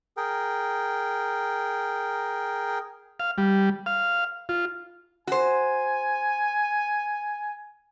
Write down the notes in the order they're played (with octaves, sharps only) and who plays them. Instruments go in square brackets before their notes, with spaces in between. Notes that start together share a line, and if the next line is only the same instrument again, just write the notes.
[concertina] G#4 A#4 G5
[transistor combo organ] F5
G3
F5
F4
[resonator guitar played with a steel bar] F#4 C5 [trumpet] G#5